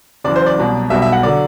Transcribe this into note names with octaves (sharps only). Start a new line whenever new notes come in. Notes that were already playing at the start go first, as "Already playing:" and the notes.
F#1 F#2 E3 D5
C5
D5
C2 B2 F#3
B1 B2 G3 B3 E5
E5
F#5
D3 F#3 D5